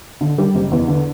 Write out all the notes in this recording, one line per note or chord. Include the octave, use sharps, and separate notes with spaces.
D3
G3
F#1
E2
D3